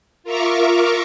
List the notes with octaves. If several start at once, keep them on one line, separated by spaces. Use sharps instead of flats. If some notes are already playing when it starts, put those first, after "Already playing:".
F4 A#4 E5 A#5 C#6 D6